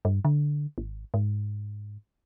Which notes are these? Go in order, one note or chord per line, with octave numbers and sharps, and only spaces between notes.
G2
D3
G#1
G#2